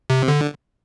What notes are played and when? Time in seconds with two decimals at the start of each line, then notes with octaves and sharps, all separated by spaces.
0.10 C3
0.28 D3